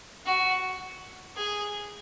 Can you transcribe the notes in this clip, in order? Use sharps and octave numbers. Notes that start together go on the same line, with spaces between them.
F#4
G#4